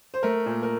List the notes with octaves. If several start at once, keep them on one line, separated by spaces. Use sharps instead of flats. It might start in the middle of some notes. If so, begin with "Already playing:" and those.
C5
A3 A#4
A#2
A#4